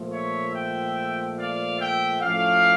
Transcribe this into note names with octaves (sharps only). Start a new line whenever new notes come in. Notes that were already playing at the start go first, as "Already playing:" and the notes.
Already playing: A#2 F3 A3
C#5 E5
E5 G5
D5 F5
E5 G5
A2 F3 A3 C#4 D5 F5